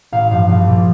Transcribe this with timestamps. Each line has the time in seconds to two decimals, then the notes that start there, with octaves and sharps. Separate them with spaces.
0.12 A1 F5
0.30 G2 F3 F5
0.48 A#1 F5
0.67 A#2 F3